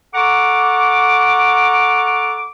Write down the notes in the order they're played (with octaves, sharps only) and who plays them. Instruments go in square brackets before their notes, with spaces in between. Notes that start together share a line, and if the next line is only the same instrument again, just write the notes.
[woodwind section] A4 F#5 A#5 C#6 D6